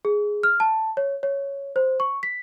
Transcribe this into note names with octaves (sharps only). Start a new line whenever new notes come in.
G#4
F6
A5
C#5
C#5
C5
C#6
B6